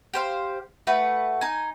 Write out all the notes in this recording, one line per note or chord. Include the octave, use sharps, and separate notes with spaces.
G4 C5 F5
A3 F#4 B4 B5
D#4 G#5